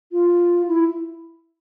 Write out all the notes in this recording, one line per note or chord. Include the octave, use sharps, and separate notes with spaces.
F4
E4